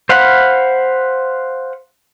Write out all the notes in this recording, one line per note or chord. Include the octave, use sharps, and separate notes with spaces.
C5 F5 F#5 B5